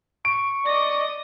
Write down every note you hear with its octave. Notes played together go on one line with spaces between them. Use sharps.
C#6 D7
D5 D#5 A#6